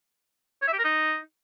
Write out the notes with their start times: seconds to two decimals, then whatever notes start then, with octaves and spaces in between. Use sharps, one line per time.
0.62 C#5
0.67 E5
0.73 G4
0.79 A#4
0.84 D#4